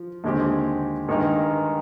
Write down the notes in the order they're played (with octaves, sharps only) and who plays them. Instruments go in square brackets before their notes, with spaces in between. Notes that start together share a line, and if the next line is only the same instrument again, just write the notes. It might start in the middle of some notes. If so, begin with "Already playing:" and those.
Already playing: [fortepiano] F3
D#2 D3 G#3 C4 G4
G2 D#3 G#3 D#4 A#4